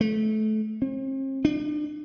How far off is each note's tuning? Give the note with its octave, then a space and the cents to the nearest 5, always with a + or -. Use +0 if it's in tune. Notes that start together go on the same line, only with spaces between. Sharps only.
A3 -25
C4 +45
D4 +35